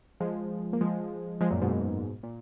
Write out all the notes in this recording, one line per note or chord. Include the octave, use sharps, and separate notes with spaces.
F3 G#3
A#3
F3 G#3
F3 G#3
F#2 A#2
G#2 B2
A#2